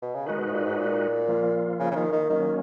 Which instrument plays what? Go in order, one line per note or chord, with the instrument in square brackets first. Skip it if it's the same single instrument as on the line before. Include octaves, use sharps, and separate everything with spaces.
[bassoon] B2
C#3
[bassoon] D#3 [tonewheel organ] G#3 D#4 F#4 B4
[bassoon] B2
G#2
A#2
G#2
A#2
[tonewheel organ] F3 A#3 F4
[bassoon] C#3
C#3
D#3
D#3
[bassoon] D#3 [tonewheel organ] F#3 A#3 C#4